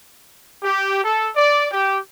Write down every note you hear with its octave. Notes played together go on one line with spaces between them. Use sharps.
G4
A4
D5
G4